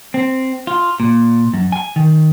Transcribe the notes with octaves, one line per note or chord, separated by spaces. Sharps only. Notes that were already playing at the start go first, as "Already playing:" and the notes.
C4
F4
A#2
F#2
G#5
D#3